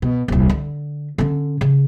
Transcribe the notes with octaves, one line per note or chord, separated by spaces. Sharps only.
B2
D#1 C2
D3
D3 C#4
C#3